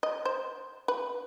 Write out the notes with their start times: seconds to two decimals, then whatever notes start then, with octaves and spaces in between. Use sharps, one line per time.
0.03 D#5
0.25 C5
0.88 B4